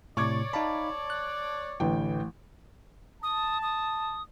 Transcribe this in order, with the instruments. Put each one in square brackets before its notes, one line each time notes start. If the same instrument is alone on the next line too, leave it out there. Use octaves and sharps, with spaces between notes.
[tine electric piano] A2 C3 [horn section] C#5 D5 [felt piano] C#6 D6 G#6
[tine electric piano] D#4 F5 B5 [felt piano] A5
[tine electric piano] F#6
[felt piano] A1 E3 G5 [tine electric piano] D3
[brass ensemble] A5 [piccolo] D#6
[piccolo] D#6